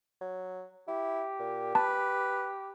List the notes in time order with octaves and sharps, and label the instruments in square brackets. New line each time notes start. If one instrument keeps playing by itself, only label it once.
[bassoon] F#3
[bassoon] E4 [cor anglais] G4
[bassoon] A#2
[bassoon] B4 [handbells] A5